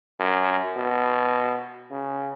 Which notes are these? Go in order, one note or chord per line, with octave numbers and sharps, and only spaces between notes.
F#2
B2
C#3